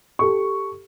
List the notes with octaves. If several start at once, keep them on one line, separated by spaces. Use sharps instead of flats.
G4 A4 C#6